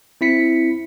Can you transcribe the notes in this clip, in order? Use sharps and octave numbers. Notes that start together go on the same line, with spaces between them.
C4 E4 B6 C#7